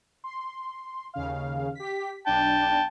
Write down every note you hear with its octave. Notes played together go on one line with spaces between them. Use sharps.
C6
D#2 C#3 F5
G4 B6
B1 D4 G5 A5